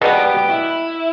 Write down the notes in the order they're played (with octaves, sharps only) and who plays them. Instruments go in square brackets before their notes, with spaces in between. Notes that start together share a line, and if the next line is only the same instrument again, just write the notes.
[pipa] B2 G3 B3 [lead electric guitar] G#4
[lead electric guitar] G4
G4
G4
E4